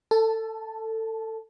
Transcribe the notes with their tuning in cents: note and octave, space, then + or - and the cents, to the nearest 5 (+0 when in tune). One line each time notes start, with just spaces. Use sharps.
A4 +20 A5 -10